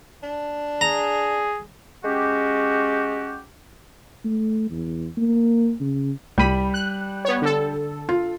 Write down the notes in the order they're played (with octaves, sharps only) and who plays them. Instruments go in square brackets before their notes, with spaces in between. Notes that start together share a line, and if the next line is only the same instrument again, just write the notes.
[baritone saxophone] D4
[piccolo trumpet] G#4 [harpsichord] A#5
[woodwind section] G#3 C#4 F#4 G4
[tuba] A3
E2
A#3
C#3
[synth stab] C2 B5 [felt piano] G3 D#7
[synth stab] F#6
B3 C#5
D3 A4
[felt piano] F4